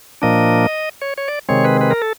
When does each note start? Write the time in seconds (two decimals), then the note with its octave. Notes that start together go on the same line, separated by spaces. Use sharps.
0.22 A#2 F3 A#3 D4 D#5
1.02 C#5
1.18 C#5
1.28 D5
1.49 C3 D#3 G#3 C4 C#5
1.65 B4
1.81 B4
1.91 A#4
2.02 A4